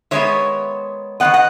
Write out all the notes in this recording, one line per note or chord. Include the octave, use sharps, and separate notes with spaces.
D#3 G#3 B3 C#5 E5
D#3 G#3 B3 D#5 F#5
D#5 F#5